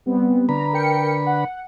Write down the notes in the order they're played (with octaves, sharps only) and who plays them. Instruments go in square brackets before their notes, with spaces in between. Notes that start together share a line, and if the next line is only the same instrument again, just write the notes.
[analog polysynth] G3 B3 C4
[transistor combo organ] D3 B4 B5 [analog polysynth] A#5
[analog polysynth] A#4 G5 C#7
F#5